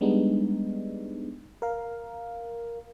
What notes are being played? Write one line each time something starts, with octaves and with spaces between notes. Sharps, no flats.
G3 G#3 B3 D4 D#4
A#4 F5